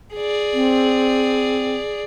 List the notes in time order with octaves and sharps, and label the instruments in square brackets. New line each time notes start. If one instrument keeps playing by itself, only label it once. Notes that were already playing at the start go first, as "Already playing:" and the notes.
[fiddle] G#4 D5
[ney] C4